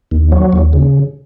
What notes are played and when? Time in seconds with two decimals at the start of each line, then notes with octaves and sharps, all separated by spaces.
0.11 D#2
0.32 F#3
0.53 D#2
0.73 C#3